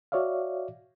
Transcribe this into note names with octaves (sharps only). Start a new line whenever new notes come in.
F#4 C#5 D5 E5 F5